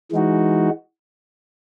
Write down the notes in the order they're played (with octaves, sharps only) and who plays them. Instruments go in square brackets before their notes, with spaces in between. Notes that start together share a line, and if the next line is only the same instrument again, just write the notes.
[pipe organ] E3 G#3 D#4 F#4